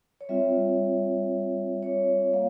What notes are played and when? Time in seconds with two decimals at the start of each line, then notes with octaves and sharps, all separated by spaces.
0.21 C#5
0.29 G3 C4 F4 E5
1.83 C#5
2.33 A#3 F5